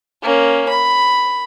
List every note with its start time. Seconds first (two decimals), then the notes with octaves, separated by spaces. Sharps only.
0.22 A#3 C#4
0.69 B5